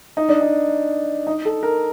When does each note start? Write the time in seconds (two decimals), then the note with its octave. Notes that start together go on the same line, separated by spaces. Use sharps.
0.17 D#4
0.29 D4
0.41 D#4
1.27 D#4
1.45 A4
1.63 A#4